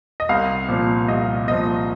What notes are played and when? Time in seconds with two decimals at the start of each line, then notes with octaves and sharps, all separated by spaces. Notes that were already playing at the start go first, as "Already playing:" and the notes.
0.20 D#5
0.29 C2 F5
0.69 A#2 F3
1.08 C2 D#5
1.48 A#2 F3 D#5